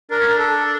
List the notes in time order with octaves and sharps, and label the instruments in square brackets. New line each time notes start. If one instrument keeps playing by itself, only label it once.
[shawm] D4 [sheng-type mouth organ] A#4
[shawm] C#4
D4
[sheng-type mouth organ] A4